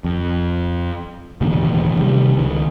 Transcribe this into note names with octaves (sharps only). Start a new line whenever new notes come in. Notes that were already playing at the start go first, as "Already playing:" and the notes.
F2
E1 A1 D#2 D3
C3 D#3 G3
C#2 D#3